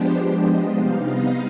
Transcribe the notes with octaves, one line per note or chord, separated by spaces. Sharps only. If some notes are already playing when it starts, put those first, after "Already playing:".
Already playing: F3 G#3 B3 D4 G4 C5
C5
D#5
C3 G3 B3 D#4 F5
D#5